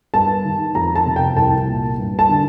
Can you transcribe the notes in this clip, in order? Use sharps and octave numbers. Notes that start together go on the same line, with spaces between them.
G2 A5
D#3
F2 A#5
A5
C3
G5
C2 A5
A#2
G2
A5
D3